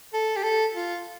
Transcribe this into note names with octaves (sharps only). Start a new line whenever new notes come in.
A4
G4
A4
F4